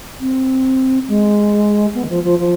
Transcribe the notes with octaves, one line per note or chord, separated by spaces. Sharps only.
C4
G#3
B3
D#3
F3
F3
F3